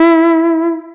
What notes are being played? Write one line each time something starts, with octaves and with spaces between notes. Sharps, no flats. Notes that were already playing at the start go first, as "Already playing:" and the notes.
Already playing: E4